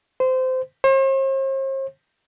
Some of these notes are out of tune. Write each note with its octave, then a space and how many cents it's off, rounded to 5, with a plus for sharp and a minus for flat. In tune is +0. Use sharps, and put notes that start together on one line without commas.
C5 -20
C5 +45